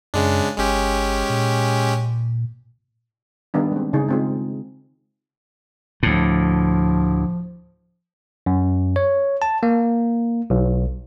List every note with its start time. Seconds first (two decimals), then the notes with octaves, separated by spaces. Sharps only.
0.14 F#2 C#3 G#3 D4
0.58 G1 G#3 C#4 G4
1.30 A#2
3.54 D#3 G3 B3 D4
3.72 G#3 C4
3.93 C#3 D#4 G#4
4.09 G#3 C4 F4
6.03 D2 A2 F3
8.46 F#2
8.96 C#5
9.42 A5
9.63 A#3
10.50 B1